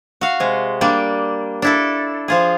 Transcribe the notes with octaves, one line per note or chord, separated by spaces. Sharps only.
F#4 F5
C3 G#3
G3 A#3 D4
D4 E4 A4
F3 F4 G#4